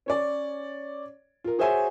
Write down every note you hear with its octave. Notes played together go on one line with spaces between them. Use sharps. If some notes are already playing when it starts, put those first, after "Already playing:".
C#4 C#5 D5
F4 A#4
F#4 G#4 C5 C#5 E5 G#5